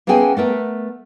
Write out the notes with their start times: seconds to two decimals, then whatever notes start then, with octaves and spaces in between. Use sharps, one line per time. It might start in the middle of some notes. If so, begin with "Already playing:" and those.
0.07 A#3 B3 C#4 G#4 G5 G#5
0.37 A3 B3 A#4 E5